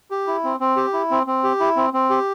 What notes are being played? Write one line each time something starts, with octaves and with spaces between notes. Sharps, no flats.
G4
E4
C4
C4
G4
E4
C4
C4
G4
E4
C4
C4
G4